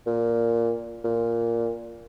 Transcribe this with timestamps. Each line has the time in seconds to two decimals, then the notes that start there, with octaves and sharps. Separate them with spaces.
0.07 A#2
1.04 A#2